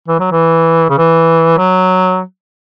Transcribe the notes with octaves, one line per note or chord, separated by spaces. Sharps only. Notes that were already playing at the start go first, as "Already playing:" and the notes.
E3
F#3
E3
C#3
E3
F#3